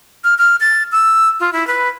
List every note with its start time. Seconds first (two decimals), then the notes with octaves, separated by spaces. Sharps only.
0.24 F6
0.38 F6
0.61 A6
0.92 E6
1.40 F4
1.53 E4
1.67 B4